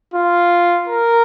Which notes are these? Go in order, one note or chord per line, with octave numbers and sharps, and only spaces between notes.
F4
A#4